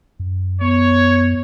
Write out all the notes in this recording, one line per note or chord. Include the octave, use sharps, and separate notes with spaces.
F#2
B3 C#5